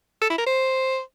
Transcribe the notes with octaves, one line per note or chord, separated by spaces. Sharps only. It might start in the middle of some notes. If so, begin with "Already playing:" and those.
A4
E4
A#4
C5